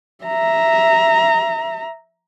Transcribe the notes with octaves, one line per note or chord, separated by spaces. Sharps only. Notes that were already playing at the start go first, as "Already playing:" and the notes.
E5 A#5